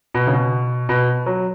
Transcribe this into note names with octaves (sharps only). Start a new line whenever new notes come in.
B2
C#3
B2
B2
F#3